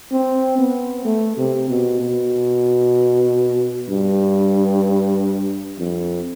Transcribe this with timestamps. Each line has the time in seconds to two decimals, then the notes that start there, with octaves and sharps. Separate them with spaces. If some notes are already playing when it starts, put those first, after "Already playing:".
0.11 C4
0.58 B3
1.05 A3
1.37 C3
1.69 B2
2.00 B2
3.89 G2
5.79 F2